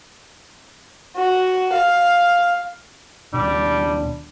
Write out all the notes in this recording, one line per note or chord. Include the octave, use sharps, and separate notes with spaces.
F#4
F5
D#2 B2 G3 D4